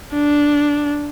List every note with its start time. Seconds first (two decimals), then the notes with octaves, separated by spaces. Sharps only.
0.13 D4